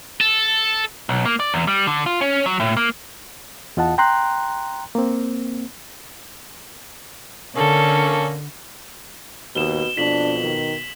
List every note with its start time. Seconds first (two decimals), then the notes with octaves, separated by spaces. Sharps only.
0.21 A4
1.09 B1
1.25 A#3
1.40 D5
1.54 E2
1.67 G3
1.87 D3
2.06 F4
2.21 C#4
2.46 F#3
2.60 A2
2.77 A#3
3.77 E2 F4 D#5 F#5 A5
3.98 G5 A#5 C6 F#6
4.95 A#3 C4
7.56 D3 A#3 C#4 A4
9.56 D#2 B2 E7 G7
9.97 F2 B2 D4 B6 E7 F#7
10.42 D#3